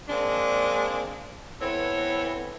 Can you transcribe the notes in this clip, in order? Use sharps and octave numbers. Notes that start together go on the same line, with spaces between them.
G#3 A#3 C4 D4
E3 B3 C4 A4 C#5